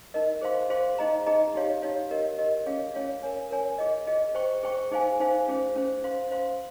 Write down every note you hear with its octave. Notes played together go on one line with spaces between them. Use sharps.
D#4 A#4 D#5
G#4 C5 F5 C6
G#4 C5 F5 C6
D#4 G#4 D#5 A#5
D#4 G#4 D#5 A#5
D#4 G4 C#5 F5
D#4 G4 C#5 F5
G4 A#4 D#5
G4 A#4 D#5
C#4 F4 G#4 C#5 F5
C#4 F4 G#4 C#5 F5
A#4 C#5 G#5
A#4 C#5 G#5
F4 G#4 D#5
F4 G#4 D#5
G#4 C5 G5 C#6
G#4 C5 G5 C#6
D#4 G#4 C5 F5 G#5
D#4 G#4 C5 F5 G#5
C#4 F4 G#4 C5
C#4 F4 G#4 C5
C5 F5 C6
C5 F5 C6